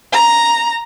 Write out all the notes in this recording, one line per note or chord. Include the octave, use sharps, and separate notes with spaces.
A#5